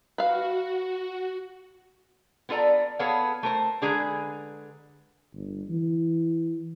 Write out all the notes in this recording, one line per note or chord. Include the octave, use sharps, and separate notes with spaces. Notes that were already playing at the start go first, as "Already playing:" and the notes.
F#4 B4 F5
B3 F4 A4 D5 A#5
B3 G#4 A4 B4 C#5 F5
A3 A#4 C5
D3 G#3 G#4 B4 G#5 A#5
G1
E3